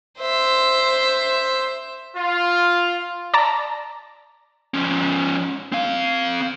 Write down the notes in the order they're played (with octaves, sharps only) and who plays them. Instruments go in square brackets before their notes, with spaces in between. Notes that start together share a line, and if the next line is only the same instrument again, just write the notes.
[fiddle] C5 E5
[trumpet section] F4
[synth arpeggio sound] D5 A5 A#5
[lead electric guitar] F3 C#4
C4 F5